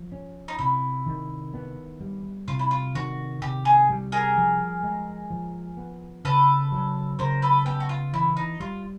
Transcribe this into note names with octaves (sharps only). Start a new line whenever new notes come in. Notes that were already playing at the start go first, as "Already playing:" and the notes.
Already playing: F3
C#4
D#4
C3 E4
D#3
B3
G3
C3 F4
E4
F4
D#3 F#4
C3 G4
G#4
G3
G#4 A#4
F3
G#3
F3
B3
C#3 A4 B4
F#3
C#3 A#4 C5
A4 B4
B3 G4 A4
F#4
F4
E3 E4
D#4
G3 F4